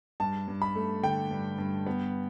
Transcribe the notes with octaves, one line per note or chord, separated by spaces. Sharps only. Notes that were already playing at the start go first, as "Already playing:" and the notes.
G2 A5
G2
B5
A3
D3 G5
G2
G2
B3